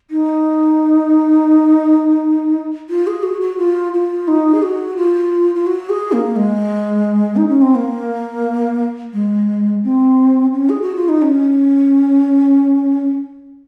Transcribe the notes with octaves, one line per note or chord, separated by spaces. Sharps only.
D#4
F4
G#4
F#4
F#4
F4
F4
D#4
G#4
F#4
F4
F4
F#4
G#4
A#3
G#3
D#4
C#4
C4
A#3
G#3
C4
C#4
G#4
F#4
F4
D#4
C#4